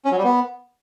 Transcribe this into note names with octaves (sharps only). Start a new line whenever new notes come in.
C#4
F#3
G3
B3